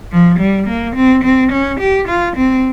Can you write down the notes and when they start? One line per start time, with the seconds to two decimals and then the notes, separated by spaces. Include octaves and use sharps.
0.12 F3
0.39 G3
0.67 A#3
0.96 C4
1.24 C4
1.52 C#4
1.80 G4
2.08 F4
2.36 C4